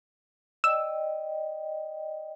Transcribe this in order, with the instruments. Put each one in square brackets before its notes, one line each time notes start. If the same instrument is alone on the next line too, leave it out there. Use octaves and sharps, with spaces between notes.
[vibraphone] D5 D#5 G5 [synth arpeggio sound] E6